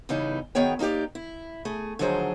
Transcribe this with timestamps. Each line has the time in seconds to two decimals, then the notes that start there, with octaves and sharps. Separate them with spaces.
0.09 E2 C#3 E3 G3 D#4
0.55 F#2 D#3 B3 G#4 C#5 G5
0.79 A#3 D#4 F#4 G4 D5
1.15 E4
1.65 A3 G#4
1.99 D3 D#3 F3 F#3 G#4 C5